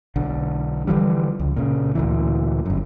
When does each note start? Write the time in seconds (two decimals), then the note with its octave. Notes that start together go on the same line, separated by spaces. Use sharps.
0.16 B1 D3
0.87 D3 E3 F3 G3
1.39 C#2
1.56 A#2 C#3
1.95 D2 A#2 E3
2.66 G1 F#2